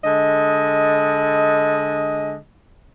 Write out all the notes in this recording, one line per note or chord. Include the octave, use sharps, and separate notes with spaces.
D3 G#3 D#5